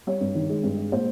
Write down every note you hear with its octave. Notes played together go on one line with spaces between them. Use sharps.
G3 C#5
G2
D#3
G#3
G2
G#3
A#2 C5